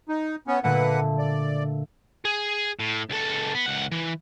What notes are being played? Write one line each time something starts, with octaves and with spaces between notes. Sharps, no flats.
D#4
B3 C#4
A#2 D3 A3 A#3 B4 F#5
D5
G#4
A2
C#2 A4
B3
C#2 F#5
E3